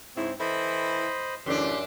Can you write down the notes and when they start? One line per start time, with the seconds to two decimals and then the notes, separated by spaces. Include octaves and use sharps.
0.16 G#2 C#3 C4 E4
0.40 E3 E4 A4 C5 D#5 B5
1.46 F#2 A2 D3 E3 D4 G4 C6